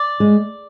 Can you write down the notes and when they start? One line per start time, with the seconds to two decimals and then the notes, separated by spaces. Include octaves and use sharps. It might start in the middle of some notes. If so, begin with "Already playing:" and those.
Already playing: D5
0.20 G#3